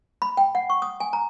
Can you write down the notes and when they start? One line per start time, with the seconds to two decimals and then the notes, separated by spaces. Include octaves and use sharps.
0.22 B5
0.37 G5
0.55 F#5
0.70 C#6
0.82 D#6
1.00 G#5
1.13 A#5